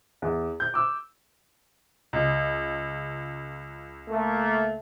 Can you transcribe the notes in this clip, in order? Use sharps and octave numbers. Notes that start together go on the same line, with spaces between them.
E2
G6
D6 E6
C#2
A3 A#3